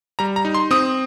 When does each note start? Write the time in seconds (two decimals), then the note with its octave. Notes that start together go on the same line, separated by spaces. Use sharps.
0.19 G3 A#5
0.36 A#5
0.45 D#4
0.54 C6
0.71 C4 D#6